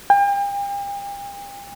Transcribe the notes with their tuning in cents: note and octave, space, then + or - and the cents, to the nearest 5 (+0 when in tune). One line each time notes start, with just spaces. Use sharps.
G5 +40